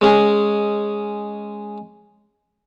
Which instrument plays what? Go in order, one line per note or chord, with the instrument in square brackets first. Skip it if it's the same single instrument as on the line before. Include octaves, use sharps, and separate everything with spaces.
[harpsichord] G#3 C#4 G#4